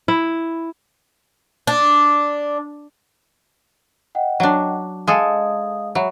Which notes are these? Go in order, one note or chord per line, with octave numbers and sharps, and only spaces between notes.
E4
D4
D#5 F#5 G5
F#3 D4
G#3 G#4 A4 D#5 F5 D#6
F#3 E5 B5